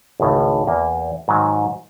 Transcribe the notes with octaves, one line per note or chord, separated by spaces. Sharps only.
G#1 C#2 A2
E2 A#3
G#2 D#3 F#3